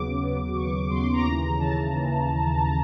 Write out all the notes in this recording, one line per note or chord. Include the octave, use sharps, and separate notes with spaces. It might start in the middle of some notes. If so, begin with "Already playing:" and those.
Already playing: D#2 C#3 F#3 B3 D6
D#2 C#3 F#3 B3
D#2 C#3 F#3 B3 C#6
D#2 C#3 F#3 B3 C6
A#5
D#2 C#3 E3
D#2 C#3 E3 A5
D#2 C#3 E3